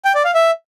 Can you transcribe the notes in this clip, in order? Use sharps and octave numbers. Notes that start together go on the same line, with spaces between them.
G5
D5
F5
E5